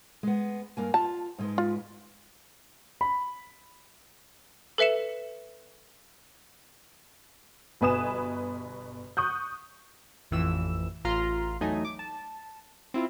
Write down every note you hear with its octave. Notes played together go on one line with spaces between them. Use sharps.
G#3 B3
G2 A#3 G#5
F4 A5
G#2 G#3 B4
F4
B5
A4 B4 E5 C#7 E7
G1 B2 B4 G#5 D#6 E7
C#6 D#6 F#6 G6
A1 F2 E3 E6 E7
A1 F4 A#5 C6 F6
E2 F#3 A3 D#4 D#5 G#5
D6
A5
C4 E4 F4